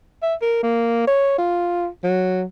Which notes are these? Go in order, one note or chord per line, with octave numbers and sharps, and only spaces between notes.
E5
A#4
A#3
C#5
F4
F#3